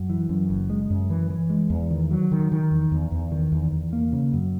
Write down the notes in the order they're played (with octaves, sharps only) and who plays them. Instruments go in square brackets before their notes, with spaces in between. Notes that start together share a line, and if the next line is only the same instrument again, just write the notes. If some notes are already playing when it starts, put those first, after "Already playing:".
Already playing: [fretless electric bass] F#2
E3
F#2
F#1
G#3
F#2
E3
E3
G#3
E2
D#3
F#3
D#3
D#3
E2
E2
E2
D#3
E2
E2
A#3
C#3
F#2